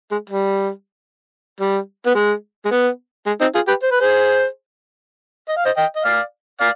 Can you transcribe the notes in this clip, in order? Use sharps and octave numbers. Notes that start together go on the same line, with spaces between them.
G#3
G3
G3
B3
G#3
G#3
B3
G#3
C4 D#4
F4 G#4
G4 B4
C5
B4
G#4 C5
D#5
F5
C5 D#5
D#5 G5
D#5
D5 F5
D5 F5